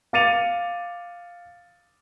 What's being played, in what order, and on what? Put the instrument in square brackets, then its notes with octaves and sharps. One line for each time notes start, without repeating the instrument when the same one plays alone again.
[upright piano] F5 D6 A6 C#7 D#7 F7